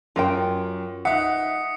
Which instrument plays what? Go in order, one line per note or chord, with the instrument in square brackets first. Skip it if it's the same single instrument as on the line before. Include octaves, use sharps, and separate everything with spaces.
[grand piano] F#2 [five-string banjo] F4 A#4 G5
[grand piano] D#4 E5 [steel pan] F#5 [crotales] D#6 C#7